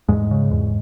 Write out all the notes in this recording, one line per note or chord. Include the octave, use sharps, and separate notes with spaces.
E2 G#2 G#3
C#3
E2